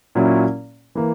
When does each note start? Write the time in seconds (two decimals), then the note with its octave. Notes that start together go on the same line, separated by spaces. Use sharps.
0.15 A#2 F#3 C#4 E4
0.95 E3 A#3